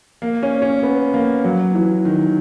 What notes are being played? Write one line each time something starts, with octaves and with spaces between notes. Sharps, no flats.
A#3
C#4
C#4
B3
A#3
F#3
E3
D#3